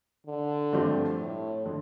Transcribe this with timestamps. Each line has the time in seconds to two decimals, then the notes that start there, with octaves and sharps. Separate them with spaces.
0.27 D3
0.73 G2 F3 A3 C4 G4
1.19 A2
1.66 D3 F3